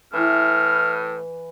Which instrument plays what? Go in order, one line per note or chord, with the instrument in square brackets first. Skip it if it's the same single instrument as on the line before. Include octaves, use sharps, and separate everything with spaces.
[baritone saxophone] A2 [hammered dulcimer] E3 [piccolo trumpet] F6